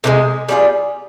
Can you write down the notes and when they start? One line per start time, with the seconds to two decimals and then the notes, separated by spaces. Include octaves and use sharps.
0.04 C3 E3 G#3
0.49 G3 C#4 F4 G#4